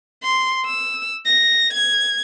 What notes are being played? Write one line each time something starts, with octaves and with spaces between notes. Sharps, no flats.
C6
E6
A#6
G#6